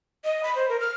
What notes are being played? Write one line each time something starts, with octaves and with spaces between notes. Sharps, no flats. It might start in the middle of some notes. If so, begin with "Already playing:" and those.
D#5
B5
C5
A#4
F6